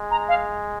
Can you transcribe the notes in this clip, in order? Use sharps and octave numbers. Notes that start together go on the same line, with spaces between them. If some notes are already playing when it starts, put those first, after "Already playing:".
Already playing: G#3
A#5
F5